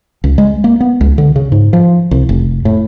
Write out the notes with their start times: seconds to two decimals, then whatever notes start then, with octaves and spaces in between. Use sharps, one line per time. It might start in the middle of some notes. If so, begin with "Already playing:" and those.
0.24 C#2
0.38 G#3
0.64 A#3
0.81 B3
1.01 C#2
1.18 D3
1.36 C#3
1.52 G#2
1.73 F3
2.11 C2
2.29 F1
2.65 A2